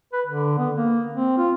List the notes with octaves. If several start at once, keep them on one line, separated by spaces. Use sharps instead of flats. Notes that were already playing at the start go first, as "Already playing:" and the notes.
B4
D3
B3
A#3
C4
F4